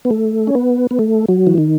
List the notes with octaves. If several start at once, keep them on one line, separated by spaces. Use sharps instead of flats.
B3
A3
C#4
B3
B3
A3
F#3
E3
D#3